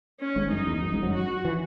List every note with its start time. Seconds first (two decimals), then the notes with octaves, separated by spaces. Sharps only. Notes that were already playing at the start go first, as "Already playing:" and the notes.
0.20 C#4
0.36 G#1 G#2
0.52 F#2 D#4
0.67 E2
0.83 F#2
0.92 G#1 G#2
1.03 F#2 F#3
1.13 F#4
1.45 E3